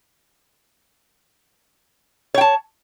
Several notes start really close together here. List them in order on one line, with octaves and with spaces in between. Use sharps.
C#5 G5 A5